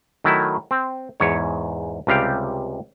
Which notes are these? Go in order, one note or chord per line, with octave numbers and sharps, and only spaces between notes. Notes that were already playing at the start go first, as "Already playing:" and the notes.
D#3 F#3 A3 E4
C4
E2 G#2 C#5
C#2 C3 G3 F5 G5